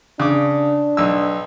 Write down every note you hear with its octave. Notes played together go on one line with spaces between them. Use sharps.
C#3 D4 D6
B1 E6